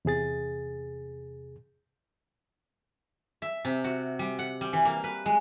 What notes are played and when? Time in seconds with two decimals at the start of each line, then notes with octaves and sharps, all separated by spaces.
0.05 E2 C3 G#4 A6
3.42 E5
3.65 C3
3.84 F#4
4.19 G3
4.39 F#5
4.61 G3
4.73 E3
4.85 A#3
5.04 B4
5.26 G#3